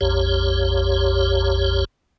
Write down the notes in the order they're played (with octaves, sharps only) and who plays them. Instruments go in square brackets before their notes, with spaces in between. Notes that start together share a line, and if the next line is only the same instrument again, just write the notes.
[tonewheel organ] A#1 F2 G4 C#5